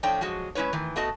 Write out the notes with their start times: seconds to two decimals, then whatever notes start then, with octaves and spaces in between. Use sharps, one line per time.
0.03 A2 F3 A3 D4 C#5 G5
0.21 F3 F#3 G#3 F#4
0.55 G#3 C#4 E4 B4 C#5
0.73 D#3 E3 A3
0.96 A3 B3 F#4 D#5 A5